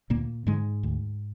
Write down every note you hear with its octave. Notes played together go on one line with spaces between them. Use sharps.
D2 A#2 A#3
G#2 D3 G#3
D2